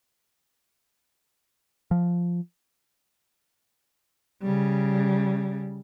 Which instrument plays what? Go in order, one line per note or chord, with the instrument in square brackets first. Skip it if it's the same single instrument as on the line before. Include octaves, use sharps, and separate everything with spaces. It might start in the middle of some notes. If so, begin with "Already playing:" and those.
[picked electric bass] F3
[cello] C#3 G3